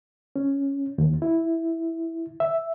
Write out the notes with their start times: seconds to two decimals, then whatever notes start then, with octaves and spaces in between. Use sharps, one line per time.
0.36 C#4
0.98 D#2
1.22 E4
2.40 E5